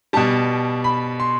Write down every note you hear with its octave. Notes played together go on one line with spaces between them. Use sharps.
B2 G3 A5
B5
C6